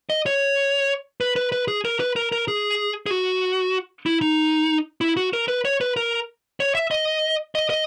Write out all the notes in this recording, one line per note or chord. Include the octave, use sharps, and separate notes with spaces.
D#5
C#5
B4
B4
B4
G#4
A#4
B4
A#4
A#4
G#4
G#4
F#4
E4
D#4
E4
F#4
A#4
B4
C#5
B4
A#4
C#5
E5
D#5
D#5
D#5